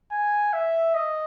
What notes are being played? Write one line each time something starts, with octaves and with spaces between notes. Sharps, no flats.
G#5
E5
D#5